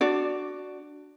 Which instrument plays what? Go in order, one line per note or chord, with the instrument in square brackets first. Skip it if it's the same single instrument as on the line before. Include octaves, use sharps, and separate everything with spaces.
[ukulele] D4 F#4 D5